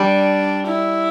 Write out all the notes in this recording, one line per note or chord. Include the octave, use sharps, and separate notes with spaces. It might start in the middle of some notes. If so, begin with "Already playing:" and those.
Already playing: G3 D4
E4